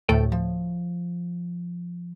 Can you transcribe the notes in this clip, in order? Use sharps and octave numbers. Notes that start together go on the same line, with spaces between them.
D2 A2 A3 A4 G5
F3